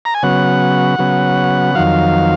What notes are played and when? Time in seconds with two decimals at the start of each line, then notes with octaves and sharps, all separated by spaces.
0.05 A#5
0.14 G#5
0.23 C#3 F#3 B3 F#5
0.99 C#3 F#3 B3
1.75 F2 D#3 F#3 F5